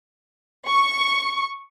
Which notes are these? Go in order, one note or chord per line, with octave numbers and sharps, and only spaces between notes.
C#6